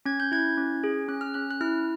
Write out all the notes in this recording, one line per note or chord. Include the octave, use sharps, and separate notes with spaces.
C#4 G#6
G6
E4 G#6
C#4
G#4
C#4 F#6
F6
C#4 F#6
F#6
E4 F6